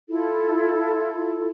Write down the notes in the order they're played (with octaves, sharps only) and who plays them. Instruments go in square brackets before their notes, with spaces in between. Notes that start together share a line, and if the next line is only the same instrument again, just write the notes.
[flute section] E4 F4 A4